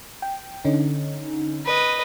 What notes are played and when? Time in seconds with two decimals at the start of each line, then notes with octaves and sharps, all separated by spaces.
0.22 G5
0.65 D3 C#4 D#4
1.65 B4 D#5